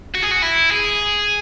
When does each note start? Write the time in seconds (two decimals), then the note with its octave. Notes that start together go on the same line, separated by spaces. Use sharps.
0.15 F#4
0.23 G#4
0.31 F#4
0.43 E4
0.71 G#4